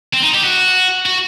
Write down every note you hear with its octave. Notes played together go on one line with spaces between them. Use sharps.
C4
D#4
G4
F#4
F#4